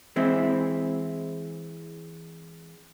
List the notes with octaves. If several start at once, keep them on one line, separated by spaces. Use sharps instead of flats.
E3 G#3 C4 E4